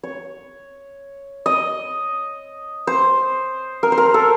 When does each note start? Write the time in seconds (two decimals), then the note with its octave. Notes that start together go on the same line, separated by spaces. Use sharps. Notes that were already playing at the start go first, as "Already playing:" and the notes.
0.03 C#5
1.46 D#5
2.87 C5
3.83 A#4
3.92 C5
3.98 A#4
4.14 A4